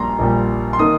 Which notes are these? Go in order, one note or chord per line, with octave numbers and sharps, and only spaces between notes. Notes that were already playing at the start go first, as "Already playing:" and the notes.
Already playing: A#1 A#2 G3 A#5 C6
A#1 A#2 G3
C6
D#3 A#3 D#4 D#6